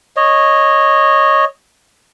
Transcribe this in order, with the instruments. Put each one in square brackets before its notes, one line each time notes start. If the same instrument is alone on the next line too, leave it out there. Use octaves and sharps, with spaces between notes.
[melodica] C#5 D#5